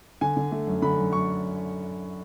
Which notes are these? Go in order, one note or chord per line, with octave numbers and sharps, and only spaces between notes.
D3 G#5
D3
A3
F#2
D3 B5
F#2
F#2 C#6